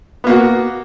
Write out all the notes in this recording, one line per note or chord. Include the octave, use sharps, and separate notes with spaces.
A#3 B3 F#4